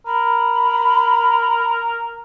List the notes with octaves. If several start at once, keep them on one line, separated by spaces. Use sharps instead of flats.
A#4 B5